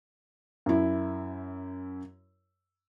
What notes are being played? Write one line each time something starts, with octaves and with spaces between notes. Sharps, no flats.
F#2 E4